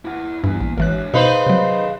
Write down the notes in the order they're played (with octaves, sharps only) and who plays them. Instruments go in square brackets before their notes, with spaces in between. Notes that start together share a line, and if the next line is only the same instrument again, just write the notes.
[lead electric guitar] E4 F#5
[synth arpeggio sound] G2 [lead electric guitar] B3 E4
[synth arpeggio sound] A#1
[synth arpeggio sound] G#1 E3 F#6 [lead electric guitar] A#4 C#5
[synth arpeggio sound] B2 [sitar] D#4 B4 C5 [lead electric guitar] G#4 F5
[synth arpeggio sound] C3 F#3